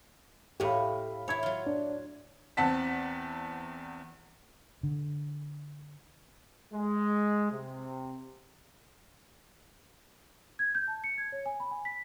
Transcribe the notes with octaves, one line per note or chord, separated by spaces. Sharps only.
A2 G4 F5 G#5 B5
E4 C#5 B5 G#6
F#3 F4
D4
E2 C4 F#5 A5 B6
D3
G#3
C3
G#6
G6
A5
C#7
G#6
C#5
G#5
B5
G#5
B6